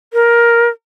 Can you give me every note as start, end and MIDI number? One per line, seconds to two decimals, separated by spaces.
0.13 0.68 70